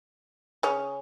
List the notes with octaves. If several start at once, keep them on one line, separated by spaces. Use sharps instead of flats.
C#3 C#4